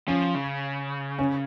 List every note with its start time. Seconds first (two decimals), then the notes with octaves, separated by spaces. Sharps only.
0.07 F3 C#4
0.35 C#3
1.19 C#4